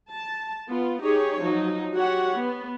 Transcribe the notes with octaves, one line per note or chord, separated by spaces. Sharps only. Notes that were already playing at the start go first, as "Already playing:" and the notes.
A5
B3 F4
D#4 G4 G#4 C#5
F3 F#3 D#4
F#4 G4 C#5 F#5
B3